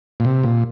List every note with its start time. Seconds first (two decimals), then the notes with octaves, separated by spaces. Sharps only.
0.20 A#2
0.25 C3
0.44 A#2